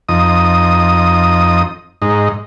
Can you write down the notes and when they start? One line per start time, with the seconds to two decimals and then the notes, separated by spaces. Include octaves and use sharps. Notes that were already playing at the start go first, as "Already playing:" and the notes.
0.09 F2 D#4 D#6
2.02 G#2 D#4